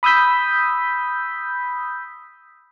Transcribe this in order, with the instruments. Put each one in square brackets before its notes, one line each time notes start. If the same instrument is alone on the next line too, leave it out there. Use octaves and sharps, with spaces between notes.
[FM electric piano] B5 D#6 E6 G6 B6